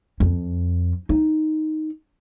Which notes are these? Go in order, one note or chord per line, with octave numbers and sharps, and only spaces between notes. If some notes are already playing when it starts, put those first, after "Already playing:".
F2
D#4